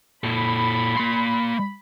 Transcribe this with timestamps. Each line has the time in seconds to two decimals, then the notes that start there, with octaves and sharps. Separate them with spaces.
0.24 A#2 A4 B5
0.97 A#3 C6